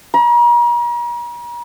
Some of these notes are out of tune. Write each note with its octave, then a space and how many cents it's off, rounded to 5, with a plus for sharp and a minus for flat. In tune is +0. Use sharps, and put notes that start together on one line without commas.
A#5 +40